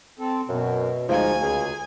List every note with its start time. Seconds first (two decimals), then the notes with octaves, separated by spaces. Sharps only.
0.19 C4 A4
0.49 F#2 B2
1.09 D2 F3 G#3 D#4 D#5 F5 G#5
1.42 C#2 G#4